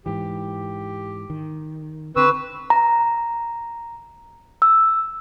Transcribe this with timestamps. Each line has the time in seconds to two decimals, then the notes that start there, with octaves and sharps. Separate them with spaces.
0.06 G#2 E3 G4
1.30 D#3
2.16 D3 C4 B4 C#6 E6
2.70 A#5
4.62 E6